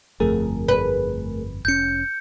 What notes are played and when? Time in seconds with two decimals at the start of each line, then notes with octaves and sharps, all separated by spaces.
0.20 G1 F2 A3 G#4 A#4
0.69 B4
1.65 F1 C#4 G6 C#7